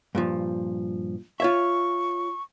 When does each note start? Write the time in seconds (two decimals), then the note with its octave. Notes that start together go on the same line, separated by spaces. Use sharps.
0.15 G2 A#2 F3
1.40 F4 C#5 E5 C#6